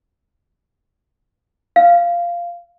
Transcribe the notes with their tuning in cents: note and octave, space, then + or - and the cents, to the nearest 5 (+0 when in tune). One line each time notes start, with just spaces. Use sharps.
F5 -10